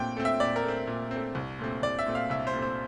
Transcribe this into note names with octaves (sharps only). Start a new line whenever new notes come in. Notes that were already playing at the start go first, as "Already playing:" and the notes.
Already playing: A#2 A3 C4 G5
A3 C4
E5
A#2 D5
A#4
A3 C4
A#2
A3 C4
C2
A#2 A3 C4
C2 D5
E5
A#2 A3 C4
F5
C2 E5
C5
A#2 A3 C4
C5